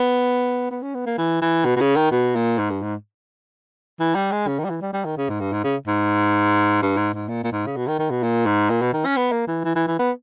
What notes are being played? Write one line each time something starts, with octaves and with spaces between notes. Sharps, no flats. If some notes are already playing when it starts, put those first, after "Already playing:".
Already playing: B3
B3
C#4
B3
A#3
E3
E3
B2
B2
C#3
D#3
B2
A#2
G#2
G2
G#2
E3
G3
G#3
C#3
D#3
G3
E3
G3
G3
D#3
C#3
G#2
G2
G#2
C#3
G#2
G2
G#2
G#2
A#2
A#2
G#2
C#3
B2
D#3
D#3
B2
A#2
G#2
A#2
B2
D#3
C#4
B3
A#3
E3
E3
E3
E3
B3